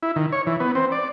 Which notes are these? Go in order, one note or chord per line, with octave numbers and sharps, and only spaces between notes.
E4
D#3
C#5
E3
B3
C4
D5